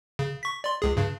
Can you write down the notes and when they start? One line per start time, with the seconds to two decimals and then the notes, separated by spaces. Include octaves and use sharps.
0.19 C#3
0.43 C#6 B6
0.64 D5 C6
0.82 C#2 G#4
0.97 G2 C#3